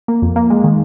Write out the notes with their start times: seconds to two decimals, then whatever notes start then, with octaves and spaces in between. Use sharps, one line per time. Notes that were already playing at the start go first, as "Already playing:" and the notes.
0.08 A#3
0.22 F2
0.36 A#3
0.50 G#3
0.64 D#3